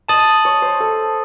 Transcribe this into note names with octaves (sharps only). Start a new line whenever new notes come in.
D#5 A5 D#6 A6 D#7 F#7
C#5
C5
A4